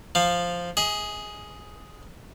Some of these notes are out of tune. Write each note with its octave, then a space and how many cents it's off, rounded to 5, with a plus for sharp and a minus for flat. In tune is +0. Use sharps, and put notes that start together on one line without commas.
F3 +0 F5 +0
G#4 +0 D#5 +30